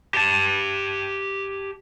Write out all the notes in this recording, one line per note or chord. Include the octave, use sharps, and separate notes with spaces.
G4 A5